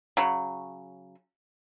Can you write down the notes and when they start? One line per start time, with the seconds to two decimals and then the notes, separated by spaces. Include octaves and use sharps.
0.17 C#3 F#3